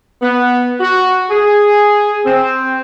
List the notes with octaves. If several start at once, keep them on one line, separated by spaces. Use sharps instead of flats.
B3
F#4
G#4
C4